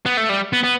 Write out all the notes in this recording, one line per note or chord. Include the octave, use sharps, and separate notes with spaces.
B3
A3
G3
B3
B3